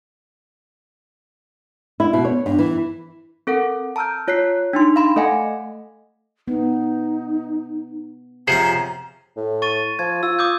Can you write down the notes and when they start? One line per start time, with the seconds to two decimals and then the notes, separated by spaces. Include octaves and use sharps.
2.00 E4
2.13 B2
2.25 C#5
2.46 G2
2.59 E3
3.47 C4 A4 A#4 F#5
3.96 A5 A#5 E6 F6 G6
4.28 F4 C#5 F#6 B6 C7
4.73 D4 D#4 C6
4.96 F5 B5 C6
5.16 A3 A4 D#5 F5 F#5 G#5
6.48 B3 D#4
8.48 C3 F3 C#4 G#4 C5 F#5 A#5
9.37 A2
9.62 C#6 A6 D#7
9.99 F3 G#6
10.23 F4 E6
10.39 D6 D#6 G6